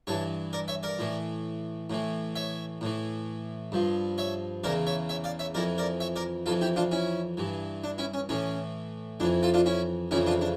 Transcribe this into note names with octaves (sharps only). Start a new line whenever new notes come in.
G2 E3 A4 C#5
A#4 D5
C#5 E5
A#4 D5
A2 E3
A2 E3
C#5 E5
A2 E3
G2 F3
C#5 E5
E2 C#3 E3 A#4 D5
C#5 E5
C#5 E5
D5 F5
C#5 E5
F2 E3 A#4 D5
A#4 D5
C#5 E5
A#4 D5
F2 E3 F4 A4
E4 G4
D4 F4
C#4 E4
G2 E3
D4
C#4 E4
C#4
A2 E3 C#4
F2 E3 D4
F4 A4
D4 F4
C#4 E4
F2 C#3 E3 C#4 E4
D4 F4
D4